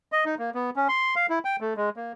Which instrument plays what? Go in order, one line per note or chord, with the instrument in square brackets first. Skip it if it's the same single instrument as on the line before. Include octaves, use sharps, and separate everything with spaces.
[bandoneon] D#5
D#4
A#3
B3
C#4
C6
F5
E4
G5
A3
G#3
A#3